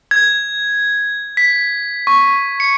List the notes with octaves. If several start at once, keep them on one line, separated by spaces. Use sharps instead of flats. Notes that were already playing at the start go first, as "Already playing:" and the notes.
G#6
B6
C#6
C#7